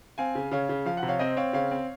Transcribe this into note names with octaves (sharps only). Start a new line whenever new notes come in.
C4 F5 G#5
C#3
C#3 C#5 F5
C#3
F3 F5
F#5
C3
C#5 F5
C4 C5 D#5
C4 C#5 F5
C#3 C#5 F5
C4